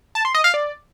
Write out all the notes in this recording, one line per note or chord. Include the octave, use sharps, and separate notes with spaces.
A5
C6
D#5
F5
D5